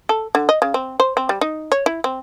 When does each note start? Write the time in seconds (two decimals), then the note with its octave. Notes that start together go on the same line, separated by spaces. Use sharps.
0.09 A4
0.35 D3
0.49 D#5
0.62 C#3
0.74 C4
1.00 C5
1.17 C4
1.29 G3
1.41 D#4
1.72 C#5
1.86 E4
2.04 C4